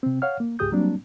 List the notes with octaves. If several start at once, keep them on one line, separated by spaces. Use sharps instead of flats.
C3 C4
C#5 F5 F#5 F6
A#3
C#2 G#2 G4 G#4 D#6 G6
F#3 G3 A#3 C4 D4